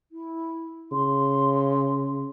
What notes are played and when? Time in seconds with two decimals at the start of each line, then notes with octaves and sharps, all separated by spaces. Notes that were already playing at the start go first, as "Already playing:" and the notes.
0.12 E4
0.92 C#3 C6